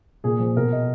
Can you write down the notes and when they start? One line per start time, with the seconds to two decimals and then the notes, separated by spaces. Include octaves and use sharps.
0.24 A#2 G#4
0.39 F3 G#4
0.56 B2 A#4
0.72 D#5